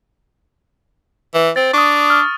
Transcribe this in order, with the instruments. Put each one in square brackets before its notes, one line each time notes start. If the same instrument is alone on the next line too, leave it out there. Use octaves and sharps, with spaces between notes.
[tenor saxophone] E3
[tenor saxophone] C4 [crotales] A6
[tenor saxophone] D4 [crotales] C#6 D#6
[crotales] F6